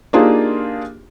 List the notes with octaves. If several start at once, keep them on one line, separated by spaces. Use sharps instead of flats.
A#3 D4 D#4 F4 G4 G#4